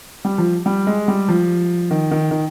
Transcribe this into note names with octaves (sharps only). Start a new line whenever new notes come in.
G3
F3
G3
G#3
G3
F3
D#3
D#3
D#3